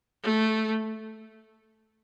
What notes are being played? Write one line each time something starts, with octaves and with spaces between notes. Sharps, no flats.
A3